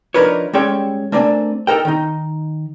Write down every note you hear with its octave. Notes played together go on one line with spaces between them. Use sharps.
F3 D4 D#4 A#4 B4 C#5
G3 G#3 C#4 A4 C#5 G5
A3 A#3 C4 D4 D5 G#5
D#4 A4 A#4 G5
D#3 D#4